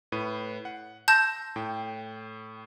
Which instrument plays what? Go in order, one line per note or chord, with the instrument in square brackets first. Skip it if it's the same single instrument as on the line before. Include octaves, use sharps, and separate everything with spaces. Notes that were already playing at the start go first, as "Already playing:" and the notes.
[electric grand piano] A2 B4 D#7
F#5
[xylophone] A5 G6 E7 [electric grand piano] C6 E6 A#6
[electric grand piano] A2 G5